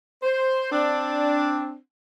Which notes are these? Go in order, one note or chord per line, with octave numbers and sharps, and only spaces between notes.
C5
C4 D4